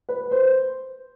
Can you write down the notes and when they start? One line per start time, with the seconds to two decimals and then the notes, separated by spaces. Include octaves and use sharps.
0.09 B4
0.31 C5